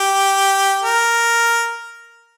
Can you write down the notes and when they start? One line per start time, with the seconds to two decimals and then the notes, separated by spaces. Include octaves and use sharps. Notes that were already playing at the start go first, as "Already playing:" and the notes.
Already playing: G4
0.84 A#4